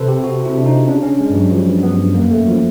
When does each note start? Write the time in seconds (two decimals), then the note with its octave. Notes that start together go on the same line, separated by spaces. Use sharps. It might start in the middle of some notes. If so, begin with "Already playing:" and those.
Already playing: C3 A4 B4 C5
0.08 G4
0.24 F#4
0.45 E4
0.58 D4
0.66 D#4
0.88 C#3 D4
1.03 C#4
1.20 G#3
1.30 G2
1.36 F#3
1.52 F3
1.83 B3
2.15 F#2 A#3
2.31 F#2 A3
2.48 F3